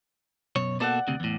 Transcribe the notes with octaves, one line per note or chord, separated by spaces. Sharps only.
F#2 B2 C#5
B2 A#3 A4 D5 F#5
D2 C3
E2 A2